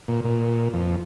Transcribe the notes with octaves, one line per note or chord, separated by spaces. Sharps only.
A#2
A#2
F2